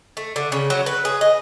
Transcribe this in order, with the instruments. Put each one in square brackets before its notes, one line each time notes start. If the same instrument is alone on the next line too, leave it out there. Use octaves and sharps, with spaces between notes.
[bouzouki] A3
D3
C#3
F#3
B4
G#4
D#5